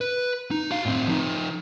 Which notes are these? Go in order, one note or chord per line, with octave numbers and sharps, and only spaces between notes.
B4
D#4
F#4 F5
A2 C4
F3 D#4